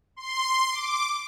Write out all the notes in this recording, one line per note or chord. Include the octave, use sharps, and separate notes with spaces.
C6
D6